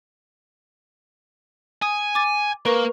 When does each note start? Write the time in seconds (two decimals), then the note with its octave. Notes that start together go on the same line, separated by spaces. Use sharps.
1.82 G#5 D#6
2.15 D6 A6
2.65 A#3 A#4 B4 C#6